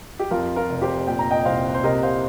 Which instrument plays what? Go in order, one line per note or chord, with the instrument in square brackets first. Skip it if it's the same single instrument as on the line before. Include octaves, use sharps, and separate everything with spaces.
[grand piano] G4
F2 F4 A#4
F4 A#4
F1
G4 C5
A#2 G5
A#5
D#5 G5
C2 C5 F5
C5
C3 A#4 D#5
C5 F5